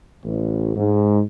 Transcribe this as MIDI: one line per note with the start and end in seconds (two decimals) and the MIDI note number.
0.25 0.72 33
0.76 1.21 44